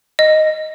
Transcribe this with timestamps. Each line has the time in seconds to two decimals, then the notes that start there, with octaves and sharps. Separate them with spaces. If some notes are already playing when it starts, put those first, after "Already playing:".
0.19 D#5